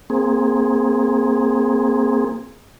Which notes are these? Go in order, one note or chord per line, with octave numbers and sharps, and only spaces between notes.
A#3 C4 G#4